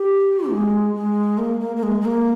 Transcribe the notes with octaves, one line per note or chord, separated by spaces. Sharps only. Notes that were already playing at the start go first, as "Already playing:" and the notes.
Already playing: G4
G#3
G#3
A#3
A#3
A#3
G#3
G#3
A#3